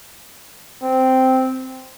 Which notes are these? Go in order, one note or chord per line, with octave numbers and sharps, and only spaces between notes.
C4